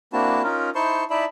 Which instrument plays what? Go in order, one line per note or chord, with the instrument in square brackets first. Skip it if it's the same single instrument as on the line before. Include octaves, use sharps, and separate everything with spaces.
[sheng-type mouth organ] A#3 C4 D4 E4 F#4 A5
C#4 D#4 F4 A#4
D#4 E4 C5 A5 C6 C#6
D#4 E4 D5 E5 A5 B5